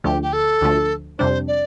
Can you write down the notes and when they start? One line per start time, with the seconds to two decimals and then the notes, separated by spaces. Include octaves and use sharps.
0.04 D2 D3 F3 A3 G4
0.22 G4
0.33 A4
0.61 D2 D3 F3 A3
1.18 F2 C3 G3 D4 C5
1.47 D5